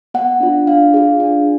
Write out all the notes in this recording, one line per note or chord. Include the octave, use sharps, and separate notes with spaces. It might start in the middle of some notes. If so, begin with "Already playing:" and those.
B3 F#5
D4 F4
D4 F5
F4 G#4
D4